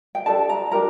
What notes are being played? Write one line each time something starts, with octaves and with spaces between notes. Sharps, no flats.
G5
D4 G4 A4 A5
A#5
D4 G4 A#4 A#5